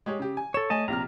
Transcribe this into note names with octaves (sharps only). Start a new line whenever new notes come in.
G#3 G4 C#5
C#3 G4
G#5
A4 C#5 E7
A3 C#5 D#5 G#5 A5
A#1 C3 A#5 F6